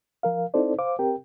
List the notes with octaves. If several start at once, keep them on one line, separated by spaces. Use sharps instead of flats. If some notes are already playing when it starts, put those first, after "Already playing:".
F3 A#4 F5
C4 D#4 E4 A4 C5 D5
C5 F5 D6
C4 G4 A#4 G5